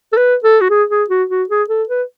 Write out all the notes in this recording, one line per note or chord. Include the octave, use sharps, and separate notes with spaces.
A4
B4
A4
F#4
G#4
G#4
F#4
F#4
G#4
A4
B4